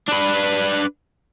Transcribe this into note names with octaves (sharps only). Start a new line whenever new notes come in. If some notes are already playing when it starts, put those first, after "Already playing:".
D4 B4